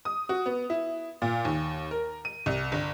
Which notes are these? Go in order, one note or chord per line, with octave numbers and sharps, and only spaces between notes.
D#6
F#4
B3
E4
A#2
D#2
A#4
D#7
C2
G1